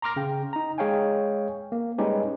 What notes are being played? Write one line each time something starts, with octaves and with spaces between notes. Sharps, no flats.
A#5 C6 D6 F6 A#6
C#3 G5
D#4 A#5
G#3 G#4 C#5 F5 G5 G#5
A#3
G3 G#3 C#4 D#4 G4 B4